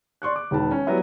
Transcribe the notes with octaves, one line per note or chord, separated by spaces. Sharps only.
D5 C6 C#6 F#6
D6
E1 D#3 B4 A5
C#4
F#3 G3 B3 E4